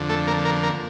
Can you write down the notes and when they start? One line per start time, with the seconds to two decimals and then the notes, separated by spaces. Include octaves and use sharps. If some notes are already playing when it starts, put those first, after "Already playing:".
Already playing: F2 D3
0.09 A3 A4
0.27 A#3 A#4
0.45 A#3 A#4
0.63 A#3 A#4